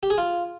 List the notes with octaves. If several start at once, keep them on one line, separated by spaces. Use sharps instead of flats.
G4
G#4
F4